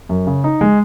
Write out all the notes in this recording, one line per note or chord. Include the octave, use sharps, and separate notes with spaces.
F#2
C#3
D#4
G#3